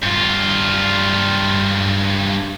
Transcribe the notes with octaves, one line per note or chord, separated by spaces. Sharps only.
G2 F4